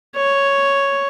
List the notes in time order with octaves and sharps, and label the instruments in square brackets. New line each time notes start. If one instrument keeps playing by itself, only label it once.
[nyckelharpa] C#5